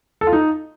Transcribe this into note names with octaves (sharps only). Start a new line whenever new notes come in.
A4
F4
D#4